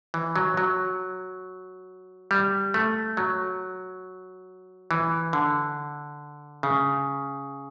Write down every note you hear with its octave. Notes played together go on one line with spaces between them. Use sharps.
E3
F#3
F#3
G3
A3
F#3
E3
D3
C#3